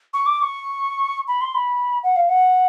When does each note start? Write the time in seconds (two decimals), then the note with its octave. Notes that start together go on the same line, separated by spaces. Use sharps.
0.14 C#6
0.26 D6
0.39 D6
0.42 C#6
1.28 B5
1.41 C6
1.55 B5
2.03 F#5
2.16 F5
2.29 F#5